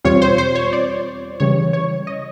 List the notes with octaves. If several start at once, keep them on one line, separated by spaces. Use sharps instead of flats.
E2 B2 G3 C4 F4 C#5
C5
C5
C#5
D5
C#3 E3 G3 C#5
C#5
D#5